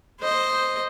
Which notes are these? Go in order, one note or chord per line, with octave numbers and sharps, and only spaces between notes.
C5 D#5